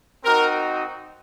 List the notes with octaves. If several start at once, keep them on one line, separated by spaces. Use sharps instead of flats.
C4 D#4 F#4 A#4